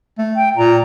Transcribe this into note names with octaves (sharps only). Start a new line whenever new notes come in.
A3
G5
A#2 A#5